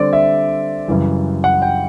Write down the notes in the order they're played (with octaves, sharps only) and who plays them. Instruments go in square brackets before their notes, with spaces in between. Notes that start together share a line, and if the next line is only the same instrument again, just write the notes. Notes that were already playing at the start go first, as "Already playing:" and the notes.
Already playing: [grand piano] D3 G3 C4 D5
E5
F#2 C#3 E3 G3
F#5
G5